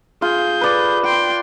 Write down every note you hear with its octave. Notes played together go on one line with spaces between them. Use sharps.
F4 G#4 G6
B4 D5
G5 C6